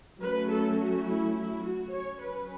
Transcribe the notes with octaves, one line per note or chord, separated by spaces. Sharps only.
F#3 A3 C#4 B4
A4
F#4
E4
E4
F#4
F#3 C#4 C#5
B4